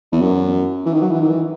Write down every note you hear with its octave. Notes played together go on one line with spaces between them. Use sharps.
E2
F#2
E3
D#3
F#3
E3
D#3
E3